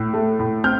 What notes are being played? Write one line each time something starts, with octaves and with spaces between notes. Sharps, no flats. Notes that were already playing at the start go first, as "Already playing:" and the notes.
Already playing: A2 E6 F#6
A3
A2
C4 F6 G6